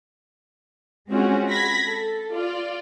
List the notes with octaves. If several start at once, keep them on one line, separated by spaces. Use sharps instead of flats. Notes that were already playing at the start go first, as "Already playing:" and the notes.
G#3 C4 C#4 F4 F#4 G#4
B5 G#6 A#6 B6
A4
F4 D5